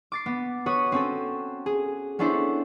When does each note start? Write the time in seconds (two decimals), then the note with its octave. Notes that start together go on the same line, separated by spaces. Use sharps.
0.12 D6 A6 C7
0.26 B3
0.66 F#4 B4 C#5 D#6
0.92 C4 C#4 A4
1.66 G#4
2.19 B3 C#4 D4 E4 A4 C5